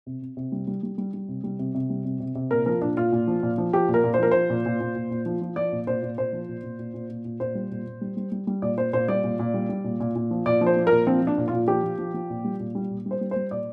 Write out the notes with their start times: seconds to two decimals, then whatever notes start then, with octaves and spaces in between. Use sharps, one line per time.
0.06 C3
0.22 C3
0.37 C3
0.52 G3
0.67 G3
0.83 G3
0.98 G3
1.14 G3
1.28 C3
1.44 G3
1.59 C3
1.74 C3
1.90 G3
2.05 C3
2.20 C3
2.35 C3
2.51 A#2 A#4
2.66 F3 A#4
2.82 A#2 D4
2.97 A#2 F4
3.12 A#2
3.27 F3
3.43 A#2
3.58 F3
3.73 F3 G4
3.88 A#2
3.94 A#4
4.04 A#2
4.14 C5
4.19 F3 A#4
4.31 F3 C5
4.50 A#2
4.65 A#2
4.80 A#2
4.95 A#2
5.11 A#2
5.26 F3
5.41 F3
5.56 F3 D5
5.72 A#2
5.87 A#2 C5
6.03 A#2
6.17 A#2 C5
6.33 F3
6.48 A#2
6.63 A#2
6.79 A#2
6.94 A#2
7.09 A#2
7.25 A#2
7.40 A#2 C5
7.55 G3
7.71 A#2
7.86 A#2
8.01 G3
8.17 G3
8.32 G3
8.47 G3
8.62 A#2 D5
8.78 A#2 C5
8.93 A#2 C5
9.08 G3 D5
9.24 A#2
9.39 A#2
9.54 G3
9.69 G3
9.84 A#2
10.00 A#2
10.15 A#2
10.31 F3
10.46 A#2 D5
10.61 F3
10.66 C5
10.77 F3
10.87 A#2 A#4
11.07 F3 C4
11.22 F3 D4
11.38 A#2
11.48 F4
11.53 A#2
11.68 F3 G4
11.83 F3
11.98 F3
12.14 F3
12.30 A#2
12.44 G3
12.60 A#2
12.75 G3
12.90 A#2
13.06 G3
13.11 C5
13.21 G3
13.31 G3 C5
13.51 A#2 D5